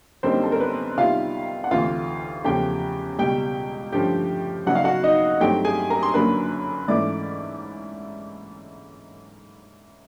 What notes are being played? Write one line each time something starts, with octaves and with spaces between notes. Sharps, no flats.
F#2 D3 G3 A#3 C4 D#4 C5
A4
A#4
B3 B4
C3 D#3 G3 B3 E4 F4 F5
F#5
D2 C3 E3 F4 F5
E2 C#3 F3 A3 C#4 G4 G5
C#2 B2 G3 G4 G5
G2 D3 F3 A3 C#4 G4 G5
C#3 F#3 B3 D#4 F#5
F5
F#4 F#5
D#4 D#5
G2 D#3 F#3 A3 C4 G4 G5
G#4 G#5
A#4 A#5
C6
F#2 D3 F#3 A#3 D4 B4 B5
G#2 E3 A3 C#4 E4 D5 D6